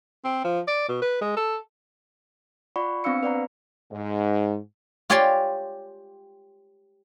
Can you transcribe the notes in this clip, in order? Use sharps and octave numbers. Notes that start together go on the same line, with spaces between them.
C4
F3
D5
B2
B4
G#3
A4
F4 D5 F#5 B5 C#6
B3 C4 D4 F5 E6 C#7
B4 D5 F#5 A#5
G#2
F4 G4 C#5 D5 G#5 C6